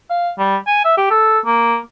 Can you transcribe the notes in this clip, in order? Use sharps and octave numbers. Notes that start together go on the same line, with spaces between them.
F5
G3
G#5
E5
G4
A4
A#3